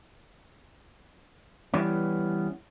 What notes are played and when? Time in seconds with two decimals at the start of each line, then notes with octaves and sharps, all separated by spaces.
1.74 E3 G3 B3 C#4